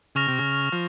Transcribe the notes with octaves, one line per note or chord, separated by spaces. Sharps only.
C#3 C#6 F6 A#6 F7
C3
C#3
F3